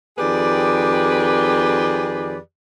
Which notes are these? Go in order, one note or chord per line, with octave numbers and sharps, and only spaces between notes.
F2 D#3 G4 G#4 B4 D5